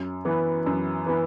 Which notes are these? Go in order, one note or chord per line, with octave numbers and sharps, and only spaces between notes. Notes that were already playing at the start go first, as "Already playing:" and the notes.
Already playing: F#2
E3 B3
F#2
E3 B3